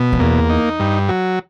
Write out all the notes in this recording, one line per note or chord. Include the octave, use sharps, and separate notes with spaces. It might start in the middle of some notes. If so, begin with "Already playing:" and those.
Already playing: B2
F2
E2 A#3
D#4
G2
F#3